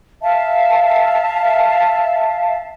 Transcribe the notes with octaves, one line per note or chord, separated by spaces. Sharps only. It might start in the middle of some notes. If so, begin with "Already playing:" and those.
E5 F5 A5